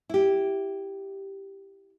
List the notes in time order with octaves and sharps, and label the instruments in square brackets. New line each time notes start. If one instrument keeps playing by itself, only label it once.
[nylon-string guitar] E4 G4